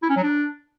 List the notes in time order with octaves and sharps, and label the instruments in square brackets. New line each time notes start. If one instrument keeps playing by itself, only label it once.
[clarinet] E4
C#4
F#3
D4